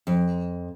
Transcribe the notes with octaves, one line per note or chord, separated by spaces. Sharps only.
F2